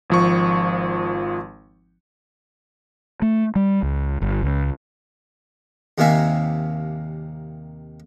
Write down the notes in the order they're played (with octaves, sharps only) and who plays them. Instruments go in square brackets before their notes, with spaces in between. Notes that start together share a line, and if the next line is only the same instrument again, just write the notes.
[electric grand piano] G#1 F3 C#6
[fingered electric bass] A3
G3
C#2
G1
C#2
[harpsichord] D#2 C3 D#3 A#3 E5 G#5